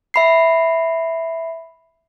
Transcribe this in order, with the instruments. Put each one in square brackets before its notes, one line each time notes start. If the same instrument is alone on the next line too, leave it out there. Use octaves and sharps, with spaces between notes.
[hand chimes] E5 B5 C7